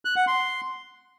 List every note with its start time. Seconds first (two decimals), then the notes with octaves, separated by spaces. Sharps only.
0.05 F#6
0.16 F#5
0.27 C6